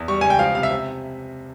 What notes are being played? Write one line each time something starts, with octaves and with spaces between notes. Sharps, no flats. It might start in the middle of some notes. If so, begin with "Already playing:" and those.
Already playing: E2
G3 C#6
C#2 G#5
G5
F3 F5
C3 F5
E5
C3